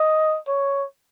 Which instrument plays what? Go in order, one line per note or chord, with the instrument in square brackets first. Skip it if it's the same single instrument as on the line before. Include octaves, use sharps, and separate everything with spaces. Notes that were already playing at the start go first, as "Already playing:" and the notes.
Already playing: [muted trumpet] D#5
C#5